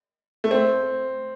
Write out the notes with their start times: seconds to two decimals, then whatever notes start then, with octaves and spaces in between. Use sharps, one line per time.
0.44 A3
0.51 C4